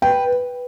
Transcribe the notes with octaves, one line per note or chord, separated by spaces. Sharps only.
B4 G5